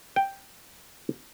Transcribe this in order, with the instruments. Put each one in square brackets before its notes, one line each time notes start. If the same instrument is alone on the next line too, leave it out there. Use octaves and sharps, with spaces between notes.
[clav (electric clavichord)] G5